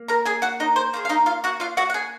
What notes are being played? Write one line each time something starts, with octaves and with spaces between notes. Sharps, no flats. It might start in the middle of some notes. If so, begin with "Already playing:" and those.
Already playing: A#3
A#4 A#5
G#4 G#5
F#4 F#5
D#4 D#5
C5
A#3 F4 G#4 C5
F5
D#4 D#5
F4 F5
F#4 F#5
F4 F5
F#4 F#5
F#5
G#4 G#5